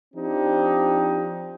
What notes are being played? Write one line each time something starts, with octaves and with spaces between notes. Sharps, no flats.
F3 C4 D4 D#4 G4